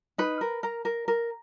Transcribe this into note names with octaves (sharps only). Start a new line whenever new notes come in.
D#4 B4
A#4
A#4 A#5
A#4
A#4